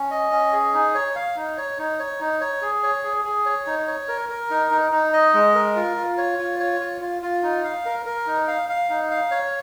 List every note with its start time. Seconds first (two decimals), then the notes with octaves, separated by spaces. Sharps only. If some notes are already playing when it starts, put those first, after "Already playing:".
Already playing: C#4
0.11 D#5
0.32 C#4
0.53 G#4
0.74 D#4
0.94 C#5
1.15 F5
1.36 D#4
1.57 C#5
1.79 D#4
1.99 C#5
2.20 D#4
2.41 C#5
2.62 G#4
2.83 C#5
3.04 G#4
3.25 G#4
3.45 C#5
3.67 D#4
3.87 C#5
4.08 A#4
4.29 A#4
4.50 D#4
4.71 D#4
4.92 D#4
5.13 D#5
5.34 G#3
5.55 A#4
5.76 F4
5.96 F4
6.18 C#5
6.39 F4
6.59 C#5
6.80 F4
7.01 F4
7.22 F4
7.43 D#4
7.64 F5
7.85 A#4
8.06 A#4
8.27 D#4
8.48 F5
8.69 F5
8.90 D#4
9.10 F5
9.31 C#5